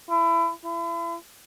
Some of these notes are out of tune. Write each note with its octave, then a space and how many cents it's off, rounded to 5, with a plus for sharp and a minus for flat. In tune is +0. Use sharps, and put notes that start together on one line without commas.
E4 +25
E4 +40